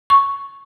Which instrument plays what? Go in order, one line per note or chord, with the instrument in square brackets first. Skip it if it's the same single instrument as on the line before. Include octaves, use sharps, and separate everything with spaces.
[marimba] C#6